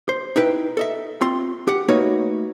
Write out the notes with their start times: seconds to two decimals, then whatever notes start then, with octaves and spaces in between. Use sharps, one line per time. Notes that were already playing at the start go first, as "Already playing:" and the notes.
0.09 C5
0.36 D#4 E4 B4 G5
0.77 A4 D#5 E5
1.21 C4 F4 C6
1.68 G4 F#5
1.88 A3 A#3 D#4 F#4 B4 C#5